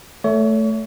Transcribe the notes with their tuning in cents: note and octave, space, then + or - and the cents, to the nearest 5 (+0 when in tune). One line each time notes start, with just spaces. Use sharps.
A3 +0 C#5 +35